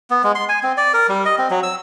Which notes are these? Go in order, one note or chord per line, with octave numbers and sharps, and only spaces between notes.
B3
G#3
C6
G#5
C4
D5
A#4
G3
D#5
C4
F#3
E6